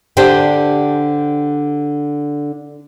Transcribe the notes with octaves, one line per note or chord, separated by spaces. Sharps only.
D3 D4 G4 C5